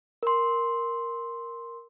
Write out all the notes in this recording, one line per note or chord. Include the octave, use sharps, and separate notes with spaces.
A#4 C6